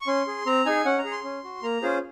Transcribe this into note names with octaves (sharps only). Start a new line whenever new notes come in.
C#6
C#4 C6
G#4
C4 A#5
D#4 G#4 G#5
C#4 F#5
A#5
G#4
C6
C#4
F#4
A#3 A#5
C#4 F4 G#4 C5